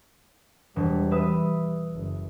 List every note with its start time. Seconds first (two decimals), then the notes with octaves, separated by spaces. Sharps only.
0.76 E1 G3
1.11 B4 E5 D#6
1.94 F#1